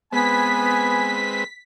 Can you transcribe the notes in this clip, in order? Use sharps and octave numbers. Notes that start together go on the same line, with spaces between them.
G#3 B3 C4 B4 G#5 B6